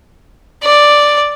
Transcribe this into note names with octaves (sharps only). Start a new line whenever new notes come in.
D5